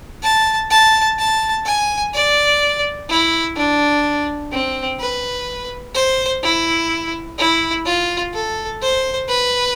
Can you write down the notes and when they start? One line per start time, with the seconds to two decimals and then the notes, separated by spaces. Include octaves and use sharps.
0.23 A5
0.70 A5
1.18 A5
1.66 G#5
2.14 D5
3.09 E4
3.56 D4
4.52 C4
5.00 B4
5.94 C5
6.43 E4
7.38 E4
7.85 F4
8.33 A4
8.82 C5
9.28 B4